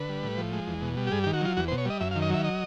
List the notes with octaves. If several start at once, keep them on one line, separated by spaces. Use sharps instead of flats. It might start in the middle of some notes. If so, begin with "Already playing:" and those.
Already playing: D3 B4
G3
A2
F3
G#3
E2
B2
G3
G4
G2 G#4
G4
D#3
F#4
F#3 F4
E2 F#4
C5
B2
C#5
G3 D#5
F#2 E5
F5
D#3
D#5
F#3 E5
D#5